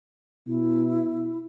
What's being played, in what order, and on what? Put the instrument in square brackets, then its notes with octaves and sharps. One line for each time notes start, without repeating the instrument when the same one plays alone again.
[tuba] B2 [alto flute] E4